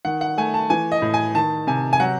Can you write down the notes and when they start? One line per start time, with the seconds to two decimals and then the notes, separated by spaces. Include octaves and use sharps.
0.05 D#3 F#5
0.21 F#5
0.37 A3 G#5
0.54 A5
0.70 E3 G#5
0.92 D#5
1.02 A2
1.14 G#5
1.34 D#3 A5
1.67 C3 G#5
1.93 G#5
2.00 F#3 F#5